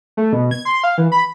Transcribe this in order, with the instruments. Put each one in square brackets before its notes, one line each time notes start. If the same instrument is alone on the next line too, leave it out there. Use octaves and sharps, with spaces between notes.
[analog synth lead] A3
B2
G#6
C6
F5
E3
B5